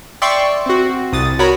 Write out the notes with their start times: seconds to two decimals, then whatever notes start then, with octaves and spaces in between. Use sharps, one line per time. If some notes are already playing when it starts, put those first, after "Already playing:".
0.22 D5 E5 G5 C6 C#6
0.66 C4 F#4
1.13 C2 D#6 A6
1.39 F#4 A#4 C#5 A#5 B5